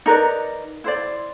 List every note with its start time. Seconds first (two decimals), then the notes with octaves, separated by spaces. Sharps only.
0.06 D#4 A#4 B4 D5
0.84 E4 C5 D5